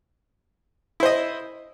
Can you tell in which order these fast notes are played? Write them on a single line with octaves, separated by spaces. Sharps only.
E4 C5 D#5